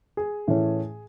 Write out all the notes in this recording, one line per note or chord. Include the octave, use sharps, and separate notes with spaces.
G#4
A2 E3 A3 C#4